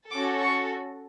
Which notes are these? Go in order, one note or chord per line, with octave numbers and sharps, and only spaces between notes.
C#4 F#4 A4 D6
C#6